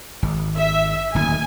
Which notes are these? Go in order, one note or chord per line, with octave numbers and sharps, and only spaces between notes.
G#1
E5
D1 D#2 G#5